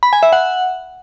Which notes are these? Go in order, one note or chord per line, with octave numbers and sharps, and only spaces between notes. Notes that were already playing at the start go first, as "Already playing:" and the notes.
B5
G#5
E5
F#5